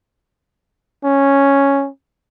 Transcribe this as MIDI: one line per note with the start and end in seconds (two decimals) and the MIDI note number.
1.04 1.89 61